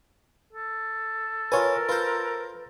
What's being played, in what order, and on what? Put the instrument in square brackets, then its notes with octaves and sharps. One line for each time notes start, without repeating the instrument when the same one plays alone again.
[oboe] A4
[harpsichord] F4 G#5 [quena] A#4 [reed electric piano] B4 C#5
[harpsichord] F4 C5 [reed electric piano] B4